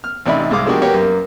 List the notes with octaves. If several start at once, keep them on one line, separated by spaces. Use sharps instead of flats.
F6
A1 C3 D#4 D5 E5 B5
C2 G#2 G#3 F5 D6 D#6
F3 G#3 A#3 D4 F#4 G4
A#3 F#4 G4 B4 C#5
F#2 A#3